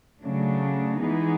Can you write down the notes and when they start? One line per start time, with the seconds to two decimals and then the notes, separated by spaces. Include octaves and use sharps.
0.21 C#3 F#3 A3 D4
1.00 E3 G#3 B3 D#4 G#4